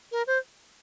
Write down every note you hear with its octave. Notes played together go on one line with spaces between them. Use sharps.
A#4
C5